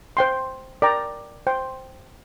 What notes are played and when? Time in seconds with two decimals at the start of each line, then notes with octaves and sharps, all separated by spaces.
0.17 C5 G5 C6
0.82 A#4 D5 G5 A#5
1.47 C5 G5 C6